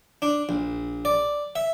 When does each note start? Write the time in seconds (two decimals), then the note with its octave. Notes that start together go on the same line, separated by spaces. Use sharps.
0.22 D4
0.49 A#1
1.05 D5
1.56 E5